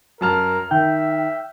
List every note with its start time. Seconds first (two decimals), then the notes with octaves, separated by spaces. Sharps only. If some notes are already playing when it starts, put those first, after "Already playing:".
0.21 F#2 A#4 A5 F6
0.71 D#3 E5 G5